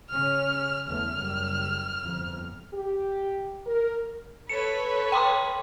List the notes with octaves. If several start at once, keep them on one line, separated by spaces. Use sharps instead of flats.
C#3 C#4 F6
E2 A3 F6
F#1 G3
G1 F2
G4
A#4
A4 B4 C#5 C#7
G5 C6 D6